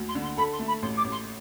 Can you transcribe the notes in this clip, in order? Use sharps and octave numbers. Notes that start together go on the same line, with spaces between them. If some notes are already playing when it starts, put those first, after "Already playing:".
Already playing: D2
C6
D3
C6
A4 B5
C6
A3
B5
A1 C6
D6
A1
C6